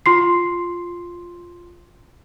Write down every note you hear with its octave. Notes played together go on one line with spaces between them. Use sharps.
F4 C6 C7